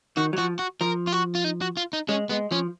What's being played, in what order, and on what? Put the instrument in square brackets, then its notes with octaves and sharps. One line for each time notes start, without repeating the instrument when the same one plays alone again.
[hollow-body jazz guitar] D#3 [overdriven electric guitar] F#4
[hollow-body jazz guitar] F#3
[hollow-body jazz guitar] F3 [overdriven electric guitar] F#4
[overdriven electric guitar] F#4
[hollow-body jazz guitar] F3 [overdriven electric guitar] A#4
[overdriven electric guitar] F4
F#4
F4
D#4
F#4
F4
D#4
[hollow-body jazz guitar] G#3 [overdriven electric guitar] C#4
[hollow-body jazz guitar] G#3 [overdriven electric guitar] B3
[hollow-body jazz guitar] F3 [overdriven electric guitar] C#4